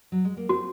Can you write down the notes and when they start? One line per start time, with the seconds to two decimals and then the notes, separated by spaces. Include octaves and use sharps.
0.12 F#3
0.25 G#3
0.37 A#3
0.49 C4 F#4